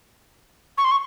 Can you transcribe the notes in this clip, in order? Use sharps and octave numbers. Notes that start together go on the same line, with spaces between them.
C#6
C6
C#6